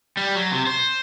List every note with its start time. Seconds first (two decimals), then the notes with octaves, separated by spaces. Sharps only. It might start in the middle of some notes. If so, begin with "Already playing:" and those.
0.17 G3
0.35 F#3
0.52 C3
0.67 C5